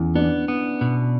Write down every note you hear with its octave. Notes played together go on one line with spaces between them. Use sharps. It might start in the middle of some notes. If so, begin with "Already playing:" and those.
Already playing: E2 C#4 E4
B3 D4
B3
B2